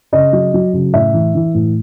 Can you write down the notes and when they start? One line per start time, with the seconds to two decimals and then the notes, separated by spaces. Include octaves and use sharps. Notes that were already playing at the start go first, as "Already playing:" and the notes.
0.12 C#3 D#5
0.33 F#3
0.54 F#3
0.73 C#3
0.93 A2 E5
1.14 E3
1.35 E3
1.54 A2